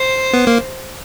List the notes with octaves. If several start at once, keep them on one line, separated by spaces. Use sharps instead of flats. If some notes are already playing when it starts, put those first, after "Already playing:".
Already playing: C5
B3
A#3